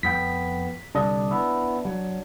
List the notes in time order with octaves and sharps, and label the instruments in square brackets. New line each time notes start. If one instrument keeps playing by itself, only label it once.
[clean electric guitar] F2 B3 G5 [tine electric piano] B6
[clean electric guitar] C2 D3 D#5 [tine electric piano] D4
[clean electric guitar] B3 E4
F#3